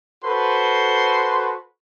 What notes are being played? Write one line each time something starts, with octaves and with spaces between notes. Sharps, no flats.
F#4 A4 B4 C5 C6